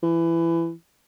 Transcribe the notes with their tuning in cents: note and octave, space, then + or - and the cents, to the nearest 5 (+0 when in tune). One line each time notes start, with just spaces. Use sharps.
E3 +20